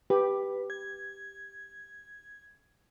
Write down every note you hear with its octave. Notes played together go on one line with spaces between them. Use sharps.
G4 B4
G#6